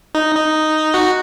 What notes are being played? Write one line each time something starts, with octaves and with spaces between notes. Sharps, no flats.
D#4
D#4
F#4